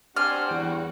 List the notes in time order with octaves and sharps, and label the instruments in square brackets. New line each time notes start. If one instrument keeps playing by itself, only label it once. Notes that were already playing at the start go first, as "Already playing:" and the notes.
[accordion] C4 D4 G4 [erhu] F#4 [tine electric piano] D5 G#5 C6 [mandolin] F6
[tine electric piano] E2 G5 [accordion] G3